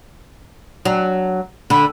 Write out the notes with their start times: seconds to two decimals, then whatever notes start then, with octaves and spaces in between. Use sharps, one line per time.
0.85 F#3 D4
1.70 D3 B5